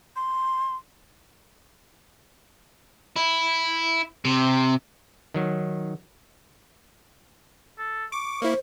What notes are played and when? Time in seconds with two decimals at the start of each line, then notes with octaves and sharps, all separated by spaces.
0.16 C6
3.16 E4
4.25 C3
5.34 D#3 F#3
7.78 A4
8.12 C#6 D6
8.42 A#3 E4 C5